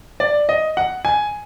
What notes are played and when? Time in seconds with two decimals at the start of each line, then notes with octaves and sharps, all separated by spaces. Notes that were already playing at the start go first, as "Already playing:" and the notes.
0.20 D5
0.49 D#5
0.77 F#5
1.05 G#5